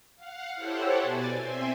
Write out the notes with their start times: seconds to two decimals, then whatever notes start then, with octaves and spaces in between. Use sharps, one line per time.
0.16 F5 F#5
0.55 E4 G4 A4 C5 C#5 F#5
1.01 B2 D5 G#5 A6
1.36 C4 E5 G#5 C6